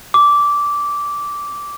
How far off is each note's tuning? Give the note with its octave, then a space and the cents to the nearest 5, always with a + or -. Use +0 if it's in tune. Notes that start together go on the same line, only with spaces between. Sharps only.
D6 -15